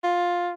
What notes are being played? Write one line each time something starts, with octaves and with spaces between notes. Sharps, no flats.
F4